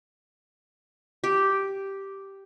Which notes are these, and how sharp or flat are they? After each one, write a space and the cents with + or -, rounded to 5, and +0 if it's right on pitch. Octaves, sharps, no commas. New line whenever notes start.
G4 -5